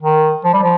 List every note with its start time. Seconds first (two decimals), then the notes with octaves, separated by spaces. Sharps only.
0.02 D#3
0.44 F3
0.53 G3
0.62 F3